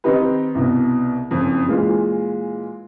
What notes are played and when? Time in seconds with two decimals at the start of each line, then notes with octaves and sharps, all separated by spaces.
0.04 D#3 C4 D#4 G4 B4
0.55 C2 B2
1.31 F#1 F2
1.67 A#2 E3 G#3 F4